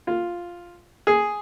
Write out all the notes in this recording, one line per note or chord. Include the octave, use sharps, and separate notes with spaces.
F4
G#4